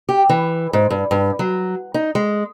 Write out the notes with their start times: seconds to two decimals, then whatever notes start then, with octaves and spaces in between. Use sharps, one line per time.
0.09 G4
0.29 E3
0.73 G#2
0.90 G2
1.11 G2
1.39 F#3
1.94 D#4
2.15 G#3